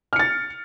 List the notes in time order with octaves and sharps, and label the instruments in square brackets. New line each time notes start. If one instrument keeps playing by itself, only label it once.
[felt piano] F6
C#7
A6